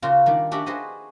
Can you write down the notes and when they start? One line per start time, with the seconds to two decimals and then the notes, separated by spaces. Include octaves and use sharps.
0.02 C#3 A#3 F4 F#4
0.26 D#3 G3 D4
0.51 C#4 D4 F#4 G4 E5
0.66 F#4 G#4 B4 C5 D#5